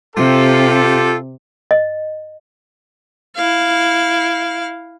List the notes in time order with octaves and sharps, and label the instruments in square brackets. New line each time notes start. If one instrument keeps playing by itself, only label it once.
[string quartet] C3 [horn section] F4 G4 A4
[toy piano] D#5
[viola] E4 F5